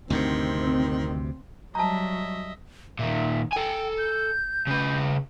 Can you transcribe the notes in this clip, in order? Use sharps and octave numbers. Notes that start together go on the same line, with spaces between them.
D2 G2 C3 D#3 C4
F#3 G3 D#5 E5 A5 A#5
A#2 D#3 E5
A4 G5 G#5
G6
C#3 B4